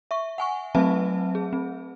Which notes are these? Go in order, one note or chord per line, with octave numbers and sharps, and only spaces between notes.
E5 C#6
F#5 G#5 C#6
F#3 A3 C4 B4 E5 A5
G#4
C4